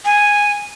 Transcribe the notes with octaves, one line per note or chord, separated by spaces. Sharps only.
G#5